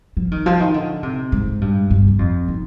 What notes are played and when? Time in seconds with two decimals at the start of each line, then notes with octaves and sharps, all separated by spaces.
0.17 F3
0.31 D#3
0.46 F3
0.60 D#3
0.74 D3
1.03 C3
1.32 G#2
1.61 G2
1.91 G2
2.08 G2
2.19 F2
2.48 D#3